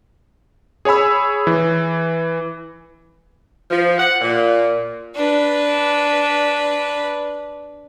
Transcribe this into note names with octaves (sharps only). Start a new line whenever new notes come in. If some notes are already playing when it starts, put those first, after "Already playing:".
G#4 C#5 G#5 B5 E6
E3
F3
F#5
A#2
D4 B4